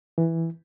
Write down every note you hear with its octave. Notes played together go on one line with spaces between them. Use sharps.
E3